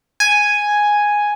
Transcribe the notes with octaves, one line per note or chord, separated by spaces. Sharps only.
G#5